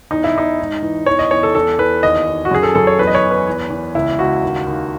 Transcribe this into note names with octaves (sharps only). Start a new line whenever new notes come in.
E2 D#4
E4
E2 D#4
G#2
E3
E2 C#5
D#5
E2 C#5
A4
E2 A4
E2 B4
D#2 D#5
D#2
F#4
F#2 G#4
A4
F#2 A4
C#5
E2 B4
D#5
C#5
E2
B4
E2
E2
C#2 E4
C#2 F#4
D#2
D#2